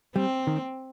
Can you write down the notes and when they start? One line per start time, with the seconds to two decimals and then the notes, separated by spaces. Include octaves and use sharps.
0.16 G3 C4
0.47 D#3